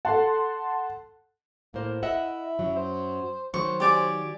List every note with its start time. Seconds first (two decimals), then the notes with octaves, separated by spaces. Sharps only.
0.05 A4 F#5 A5 C6
1.74 A2 A#3 C5
2.03 E4 D#5 E5 F#5
2.59 F#2 F#3
2.76 C5
3.54 D#3 F#3 C5 C#6
3.80 G4 D5 G#5